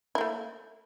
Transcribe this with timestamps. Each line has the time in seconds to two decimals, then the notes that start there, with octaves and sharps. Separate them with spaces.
0.15 E4
0.18 A#3
0.21 A3